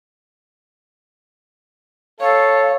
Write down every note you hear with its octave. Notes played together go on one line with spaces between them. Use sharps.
A4 C#5 F5